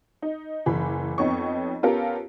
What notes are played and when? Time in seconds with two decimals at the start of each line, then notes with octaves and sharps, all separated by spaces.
0.22 D#4
0.66 F#1 E3 B5
1.18 F2 B3 D#4 C#5 C#6
1.83 B3 C#4 F4 G4 A4 A#4